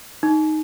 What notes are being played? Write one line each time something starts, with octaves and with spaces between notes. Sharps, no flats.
D#4